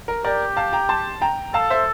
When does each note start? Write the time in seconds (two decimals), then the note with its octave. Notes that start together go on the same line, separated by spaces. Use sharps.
0.08 A#4
0.24 G4 A#4 D5
0.56 F5 A5
0.73 G5 A#5
0.89 A5 C6
1.21 G5 A#5
1.54 A4 F5 A5
1.70 C5 E5